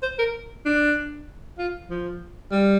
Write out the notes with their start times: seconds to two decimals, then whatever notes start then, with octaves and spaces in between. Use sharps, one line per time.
0.03 C5
0.19 A#4
0.66 D4
1.58 F4
1.90 F3
2.52 G3